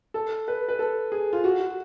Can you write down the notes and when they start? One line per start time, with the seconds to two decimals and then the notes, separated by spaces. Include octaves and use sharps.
0.14 A4
0.48 B4
0.68 B4
0.79 A4
1.12 G#4
1.33 F4
1.44 F#4
1.60 F#4